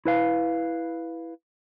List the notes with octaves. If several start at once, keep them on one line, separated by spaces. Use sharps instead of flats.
E4 B4 F5